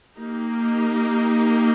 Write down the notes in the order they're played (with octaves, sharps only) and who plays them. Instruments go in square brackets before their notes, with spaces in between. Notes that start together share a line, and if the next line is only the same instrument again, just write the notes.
[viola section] A#3 D#4 G4